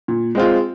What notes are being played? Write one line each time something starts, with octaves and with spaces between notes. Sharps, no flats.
A#2
G#3 C4 F4